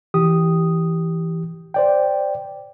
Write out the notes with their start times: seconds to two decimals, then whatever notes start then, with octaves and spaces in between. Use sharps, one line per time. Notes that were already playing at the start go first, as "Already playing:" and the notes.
0.14 E3 G4 D#6
1.74 C5 D5 G5